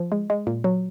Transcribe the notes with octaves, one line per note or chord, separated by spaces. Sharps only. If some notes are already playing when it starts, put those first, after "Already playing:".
Already playing: F3
G#3
G#3
A#2
F#3